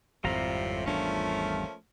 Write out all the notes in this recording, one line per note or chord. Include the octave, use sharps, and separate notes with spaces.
G#1 F2 A2 C3 F3 G3 F4 A#5
G#1 E2 F3 A3 A#3 C#4 D4